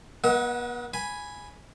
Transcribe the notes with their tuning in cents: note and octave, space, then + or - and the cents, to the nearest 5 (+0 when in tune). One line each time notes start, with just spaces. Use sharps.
B3 -40 D#5 +40 F#5 -5
G#5 +0 B5 +0